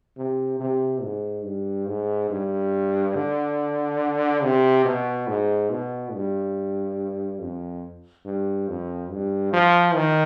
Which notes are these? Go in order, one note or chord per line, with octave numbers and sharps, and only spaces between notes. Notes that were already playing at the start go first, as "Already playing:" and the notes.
C3
C3
G#2
G2
G#2
G2
D3
C3
B2
G#2
B2
G2
F2
G2
F2
G2
F3
D#3